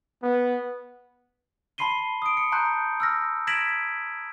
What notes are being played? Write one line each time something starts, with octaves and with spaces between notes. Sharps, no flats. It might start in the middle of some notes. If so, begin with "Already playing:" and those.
B3
A5 B5 C6 C7 D#7 G7
D#6 D7
C#7
A5 A#5 C6 F#6 G6
E6 F6 A#6
G#6 A#6 B6 D7 E7 F#7